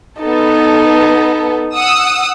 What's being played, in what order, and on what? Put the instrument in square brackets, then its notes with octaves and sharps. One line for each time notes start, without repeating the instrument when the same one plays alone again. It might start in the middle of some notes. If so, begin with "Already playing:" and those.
[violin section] B3 A4 [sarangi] D#4
[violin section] F#5 D#6 E6